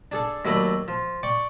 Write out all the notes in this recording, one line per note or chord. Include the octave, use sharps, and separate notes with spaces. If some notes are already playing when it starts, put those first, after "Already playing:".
D4 G#4 A4
D#2 F#3 A3 D5 D#5 B5
F3
D5 G5 C#6 D6